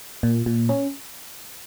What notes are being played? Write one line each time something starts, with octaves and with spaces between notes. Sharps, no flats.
A#2
A#2
C#4